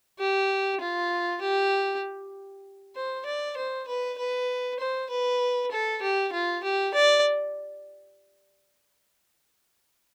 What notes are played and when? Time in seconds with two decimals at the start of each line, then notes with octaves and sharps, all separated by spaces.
0.19 G4
0.81 F4
1.42 G4
2.96 C5
3.26 D5
3.57 C5
3.88 B4
4.18 B4
4.79 C5
5.10 B4
5.71 A4
6.02 G4
6.33 F4
6.64 G4
6.94 D5